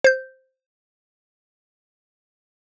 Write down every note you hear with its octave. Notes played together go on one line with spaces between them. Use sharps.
C5 G6